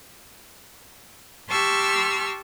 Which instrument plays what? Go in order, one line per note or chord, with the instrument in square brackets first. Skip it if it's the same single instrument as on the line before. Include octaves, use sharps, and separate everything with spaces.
[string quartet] G4 A5 C6 C#6 E6 F6